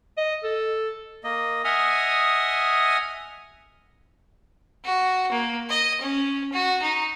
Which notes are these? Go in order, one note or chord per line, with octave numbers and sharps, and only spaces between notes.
D#5
A4
A#3 D#5
D#5 E5 F#5 G#5 D#6 F6
F#4
A#3
D#5
C#4
F#4
D#4